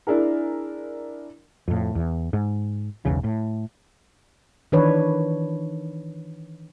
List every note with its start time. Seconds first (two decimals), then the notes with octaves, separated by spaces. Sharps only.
0.07 D4 E4 G#4 A#4
1.68 F2 A2
1.95 E2
2.33 G#2
3.05 E1 B1 E2 C#3
3.24 A2
4.72 D#3 E3 D4 B4 C#5